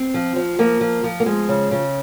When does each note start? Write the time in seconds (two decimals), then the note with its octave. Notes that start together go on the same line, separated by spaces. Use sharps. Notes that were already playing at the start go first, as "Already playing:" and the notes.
Already playing: C4
0.14 F3
0.36 F3
0.59 F3 A#3
0.81 F3
1.04 F3
1.20 A#3
1.26 F3 G#3
1.49 C#3
1.71 C#3